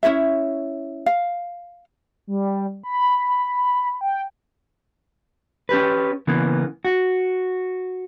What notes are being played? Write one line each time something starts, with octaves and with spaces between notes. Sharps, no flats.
C#4 E4 C#5 E5
F5
G3
B5
G5
C#4 G4 B4
C#3 E3 A#3 B3
F#4